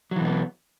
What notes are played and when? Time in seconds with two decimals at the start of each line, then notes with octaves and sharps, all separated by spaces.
0.11 F#3
0.16 E3
0.21 B2
0.25 B3